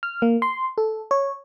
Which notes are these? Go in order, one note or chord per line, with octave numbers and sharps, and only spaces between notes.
F6
A#3
C6
A4
C#5